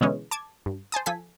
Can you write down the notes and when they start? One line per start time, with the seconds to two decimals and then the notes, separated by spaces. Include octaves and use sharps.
0.01 B2 D3 E3 G#3 C#4
0.31 A5 D6 G#6 A6
0.66 G2
0.92 C5 G#5 A5 D#6
1.06 F3 A4 G#5 B6